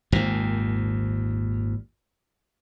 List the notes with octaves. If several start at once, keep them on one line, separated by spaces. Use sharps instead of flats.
G#1 D#2 A#2